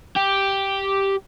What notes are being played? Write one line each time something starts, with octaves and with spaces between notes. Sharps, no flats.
G4